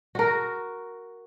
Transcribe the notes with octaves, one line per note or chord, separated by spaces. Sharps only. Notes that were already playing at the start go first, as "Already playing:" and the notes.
F#4 A#4